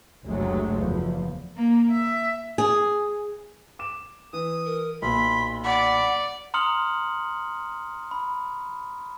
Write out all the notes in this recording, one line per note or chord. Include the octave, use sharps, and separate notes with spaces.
F#1 D2 C3 F#3 G#3 A3
F#1 E2 F3
A#3
E5
G#4
D6 E7
E3 D#6
A#4
B1 A#2 B5 C6
D5 F#5 B5
A#5 C6 D#6 F6 C#7 F#7
B5